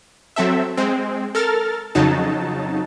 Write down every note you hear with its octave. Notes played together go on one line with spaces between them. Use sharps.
F#3 C4 A4 E5
G#3 C4
A4 A#4 F6 A6
F2 C#3 F#3 D#4 A5